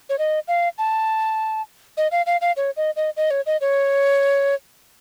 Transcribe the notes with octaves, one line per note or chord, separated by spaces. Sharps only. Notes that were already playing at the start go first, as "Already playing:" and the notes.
C#5
D#5
F5
A5
D#5
F5
F5
F5
C#5
D#5
D#5
D#5
C#5
D#5
C#5